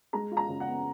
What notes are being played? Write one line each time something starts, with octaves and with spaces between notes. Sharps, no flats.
G#3 A#5
F4
A#5
C#3
F#5
B3